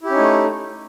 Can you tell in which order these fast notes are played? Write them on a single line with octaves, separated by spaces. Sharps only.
E4 G4 C#4 D#4 A3